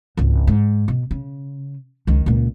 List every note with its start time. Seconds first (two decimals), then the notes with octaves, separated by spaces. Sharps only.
0.17 G#1 C#2
0.47 G#2
0.88 B2
1.11 C#3
2.07 C#2 D#3
2.26 C#2 A#2